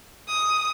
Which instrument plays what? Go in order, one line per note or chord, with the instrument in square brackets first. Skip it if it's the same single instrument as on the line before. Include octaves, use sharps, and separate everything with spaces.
[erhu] D#6